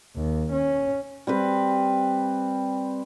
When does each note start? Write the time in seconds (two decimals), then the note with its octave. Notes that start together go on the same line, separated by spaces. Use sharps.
0.16 D#2
0.52 C#4
1.27 G3 C4 B4